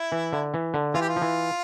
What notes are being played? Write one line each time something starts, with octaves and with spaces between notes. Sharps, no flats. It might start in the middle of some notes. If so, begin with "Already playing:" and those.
Already playing: E4
E3
D3
E3
D3
E3 F4
G4
F4
F3
E3